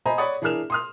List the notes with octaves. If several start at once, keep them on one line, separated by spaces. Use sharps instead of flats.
C5 D#5 G#5 A#5 B5
C#5 D5 F#5 B5 D#6
E3 D4 G#4 A#4 F6 E7
C6 D#6 F6